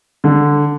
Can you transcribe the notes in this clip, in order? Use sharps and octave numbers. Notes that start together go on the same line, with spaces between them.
D3